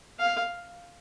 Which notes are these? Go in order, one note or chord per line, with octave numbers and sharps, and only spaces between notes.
F5